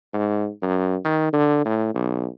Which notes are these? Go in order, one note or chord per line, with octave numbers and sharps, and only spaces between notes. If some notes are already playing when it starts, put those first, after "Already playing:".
G#2
F#2
D#3
D3
A2
B1